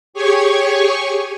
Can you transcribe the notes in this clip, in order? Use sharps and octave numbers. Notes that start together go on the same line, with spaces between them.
G4 G#4 C#5 G#5 C#6